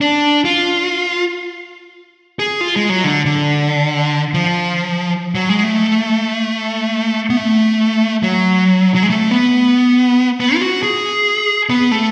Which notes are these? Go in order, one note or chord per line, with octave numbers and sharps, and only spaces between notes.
D4
F4
G#4
F4
G#3
F#3
D3
D3
F3
F#3
G#3
A3
B3
A3
F#3
F#3
G#3
A3
B3
B3
F4
F#4
G#4
B3
A3